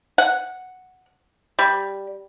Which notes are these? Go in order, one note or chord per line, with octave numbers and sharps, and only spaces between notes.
F#5
G3